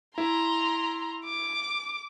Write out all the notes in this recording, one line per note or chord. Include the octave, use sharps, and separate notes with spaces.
E4 E5 A#5 C6
D6